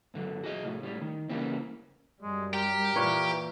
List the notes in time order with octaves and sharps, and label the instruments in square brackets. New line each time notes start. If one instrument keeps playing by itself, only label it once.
[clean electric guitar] G2 D3 F3 F#3
F#4 G#4 D#5
C2 A2
A2 G3
D#3
C#3 E3 G3 A#3 C4
[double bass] F#2 G3 [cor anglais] G#3
[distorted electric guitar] G4 [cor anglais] A#4
[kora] A#2 B4 C#5 [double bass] E3